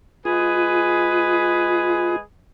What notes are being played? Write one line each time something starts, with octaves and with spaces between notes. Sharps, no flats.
G#3 F4 G#4 B4